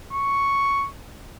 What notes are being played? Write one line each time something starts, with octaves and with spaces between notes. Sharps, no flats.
C#6